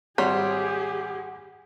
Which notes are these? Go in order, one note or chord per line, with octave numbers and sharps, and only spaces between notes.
G#1 G3 G4 G#4 C#5 F#5 C6